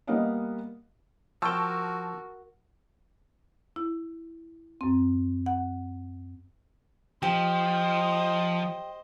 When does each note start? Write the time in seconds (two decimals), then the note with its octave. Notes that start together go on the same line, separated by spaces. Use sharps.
0.07 G3 A#3 B3 D#5 F5 F#5
1.42 F3 F#4 A#4 G5 A5 C#6 E6
3.76 E4
4.81 F#2 C4
5.46 F#5
7.23 F3 G4 C5 D#5